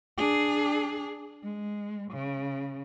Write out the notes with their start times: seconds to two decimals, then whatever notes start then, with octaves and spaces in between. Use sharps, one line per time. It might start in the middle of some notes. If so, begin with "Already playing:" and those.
0.18 D4 G#4
1.44 G#3
2.11 C#3